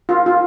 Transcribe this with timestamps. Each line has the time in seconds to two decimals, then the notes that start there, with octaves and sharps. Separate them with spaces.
0.09 F4
0.26 F4